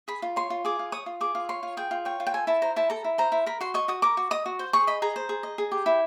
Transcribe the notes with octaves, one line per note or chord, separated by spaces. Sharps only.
G#4 B5
F4
C#5 C6
F4
G#4 D6
F4
C#5 D#6
F4
G#4 D6
F4
C#5 C6
F4
G#4 G5
F4
C#5 G5
F4
G5
A4 G#5
E4 A5
C5 A#5
E4 A5
A4 A#5
E4
C5 A#5
E4
A#4 B5
F#4 C6
D#5 C#6
F#4 D#6
A#4 D6
F#4
D#5 D#6
F#4
C5
G#4 C#6
D#5 B5
G#4 A#5
C5
G#4
D#5
G#4
G4
E4